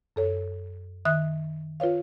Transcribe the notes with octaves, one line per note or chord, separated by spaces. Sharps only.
F#2 A4 C#5
D#3 E5 D#6 F#6
F4 B4 C#5 F5